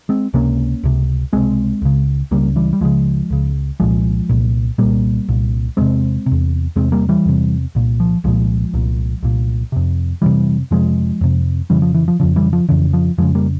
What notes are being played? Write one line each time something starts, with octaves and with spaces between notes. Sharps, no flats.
G#3 C4
C#2 C3 A#3 C#4
C#2 C3
C#2 C3 G#3 C4
C#2 C#3
C#2 C#3 G3 A#3
E3 G3
G3
C#2 C#3 F3 G#3
C#2 C#3
C2 A#2 F3 G#3
C2 A#2
C2 A#2 G3 A#3
C2 A#2
E2 C3 G#3 C4
C3
E2
E2 C3 G#3 C4
G3 A#3
E3 G3
E2 C3
C2 A#2
F3
C2 A#2 F3 G#3
C2 A#2
C2 A#2
F2 C3
F2 C3 E3 G3
F2 C3 F3 G#3
F2 C3
F2 C#3 E3 G3
F3
E3
F3
F2 C#3 F3
E3 G3
F3
F2 C#3 E3
F3
F2 C#3 F3 G#3
G3 A#3